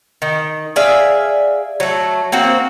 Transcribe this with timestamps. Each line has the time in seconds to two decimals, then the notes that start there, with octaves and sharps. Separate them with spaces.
0.22 D#3
0.76 G#4 D5 E5 F5
1.80 F#3 A3
2.32 A#3 C4 F#4